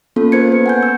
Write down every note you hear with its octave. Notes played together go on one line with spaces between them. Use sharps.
A#3 B3 C#4 F4 A4
B3 A#4 C5 G#6 C#7
B4
F#5 G#5 G6
E6